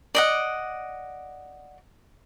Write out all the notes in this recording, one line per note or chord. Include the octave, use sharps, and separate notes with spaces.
D5 D#5 F#5